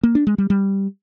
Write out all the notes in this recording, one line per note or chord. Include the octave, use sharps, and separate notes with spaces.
A#3
D4
G#3
G3
G3